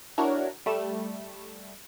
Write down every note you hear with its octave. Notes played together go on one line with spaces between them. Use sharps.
D4 E4 F#4 A#4 C#5
G3 A3 E7